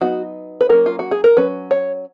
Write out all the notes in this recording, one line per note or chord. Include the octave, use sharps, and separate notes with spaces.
F#3 B3 D#4 F#4
B4
F#3 A#3 C#4 A#4
F4
F#4
G#4
A#4
F#3 C#4 B4
C#5